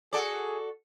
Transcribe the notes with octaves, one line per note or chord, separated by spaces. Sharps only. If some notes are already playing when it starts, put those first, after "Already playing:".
F#4 G#4 A4 D5